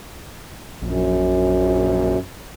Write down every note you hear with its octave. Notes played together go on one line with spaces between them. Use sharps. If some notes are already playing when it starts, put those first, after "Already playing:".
A#1 F#2